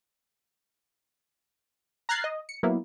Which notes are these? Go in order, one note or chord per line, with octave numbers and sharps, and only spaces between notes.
A#5 F6 F#6 G#6 A6 C7
D#5
C#7
F#3 A#3 B3 E4